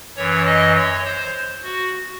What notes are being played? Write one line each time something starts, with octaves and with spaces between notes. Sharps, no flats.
F#2 E3 C#5
D#5
C#5
C5
F#4